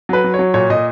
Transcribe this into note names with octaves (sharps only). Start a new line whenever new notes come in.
F#3 B4
F#3
C#5
F#3
A#2 C#5
A#2 D#5